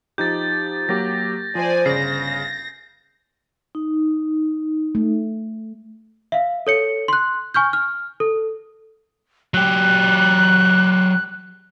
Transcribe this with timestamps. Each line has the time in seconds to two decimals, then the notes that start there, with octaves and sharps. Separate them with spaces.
0.18 F3 D#4 G4 G6 A6
0.89 F#3 A#3 G4 A#6
1.55 F3 C5 D5 G#5
1.86 G1 C#3 A#6 C7
3.75 D#4
4.95 A3
6.32 E5 F5
6.67 A4 C#5 C#7
7.08 C6 F#6
7.54 G#5 C#6 F6 G6
7.73 F6
8.20 A4
9.54 F#3 G4 F#6